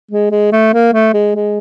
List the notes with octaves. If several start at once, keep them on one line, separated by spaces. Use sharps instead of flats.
G#3
G#3
A3
A#3
A3
G#3
G#3